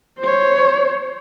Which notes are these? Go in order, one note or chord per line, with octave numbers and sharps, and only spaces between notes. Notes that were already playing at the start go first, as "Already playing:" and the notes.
C5 C#5